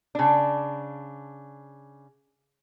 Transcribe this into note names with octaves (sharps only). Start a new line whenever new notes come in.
C#3 D4